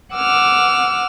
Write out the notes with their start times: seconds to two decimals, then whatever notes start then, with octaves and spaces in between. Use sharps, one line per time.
0.16 F#5 D6 E6 F6